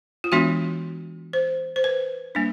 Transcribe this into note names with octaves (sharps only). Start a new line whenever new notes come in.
F4
E3 G#3 B3 D4 F#4
C5
C5
B4
G3 A#3 D4